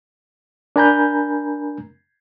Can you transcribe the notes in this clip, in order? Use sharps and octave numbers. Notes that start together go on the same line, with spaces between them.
D4 A#4 G#5 A#5 B5 G6